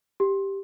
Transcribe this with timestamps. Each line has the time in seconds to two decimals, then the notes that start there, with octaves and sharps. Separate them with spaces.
0.20 G4